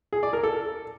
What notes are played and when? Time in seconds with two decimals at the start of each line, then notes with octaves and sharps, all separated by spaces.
0.13 G#4
0.23 D5
0.33 A#4
0.43 A4